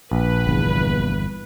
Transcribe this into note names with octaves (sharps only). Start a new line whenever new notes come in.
A#1 B4
G1 E2